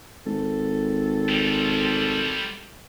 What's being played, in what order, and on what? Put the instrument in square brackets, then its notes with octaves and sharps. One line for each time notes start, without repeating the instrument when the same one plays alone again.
[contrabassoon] G#1 [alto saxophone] A4
[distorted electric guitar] G3 C4